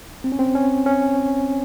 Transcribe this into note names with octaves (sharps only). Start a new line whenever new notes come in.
C4
C#4
C4
C#4
C#4